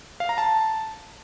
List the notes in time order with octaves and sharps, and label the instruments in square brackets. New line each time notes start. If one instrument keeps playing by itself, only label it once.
[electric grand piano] F5
A#5
A5